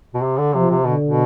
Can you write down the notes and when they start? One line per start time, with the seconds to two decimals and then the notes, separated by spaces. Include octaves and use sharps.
0.14 B2
0.22 C3
0.38 D3
0.54 C3 F3
0.70 C3
0.85 B2 D3
1.05 B2